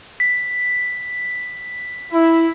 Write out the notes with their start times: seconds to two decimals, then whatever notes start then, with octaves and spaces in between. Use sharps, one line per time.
0.20 B6
2.12 E4